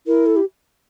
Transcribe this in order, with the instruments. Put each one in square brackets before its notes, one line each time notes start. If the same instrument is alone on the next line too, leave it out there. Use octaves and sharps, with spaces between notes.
[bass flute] E4 [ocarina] A#4
[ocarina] A4
G4